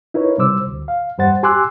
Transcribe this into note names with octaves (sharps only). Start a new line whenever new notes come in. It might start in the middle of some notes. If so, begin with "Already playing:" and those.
D#4 E4 A#4 B4 C#5
C3 G3 C5 D6 E6
D2
F5
E2 G2 G3 C5 F#5 A6
G4 G#5 C6 D6 E6 F#6